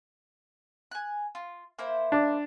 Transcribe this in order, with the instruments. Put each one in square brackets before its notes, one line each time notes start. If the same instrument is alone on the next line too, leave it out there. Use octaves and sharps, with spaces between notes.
[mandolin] G#5 F#6
F4
A#3 E4 C5
[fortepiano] D4